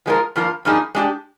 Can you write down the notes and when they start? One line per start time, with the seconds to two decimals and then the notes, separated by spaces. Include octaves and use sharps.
0.06 F3 G#3 C4 F4 A#4
0.36 G2 F3 A#3 F4 A#4
0.65 G2 F3 A#3 D#4 G#4
0.95 G#3 D4 G4